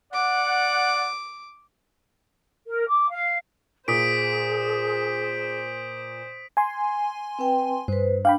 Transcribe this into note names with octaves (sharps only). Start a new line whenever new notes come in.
D5 F#5 D6
A#4
D6
F5
A#2 G#4 C5 D#6 B6 D7
G#5 C6
C4 B4 G5
G2 B4 C5
D4 F5 G5 B5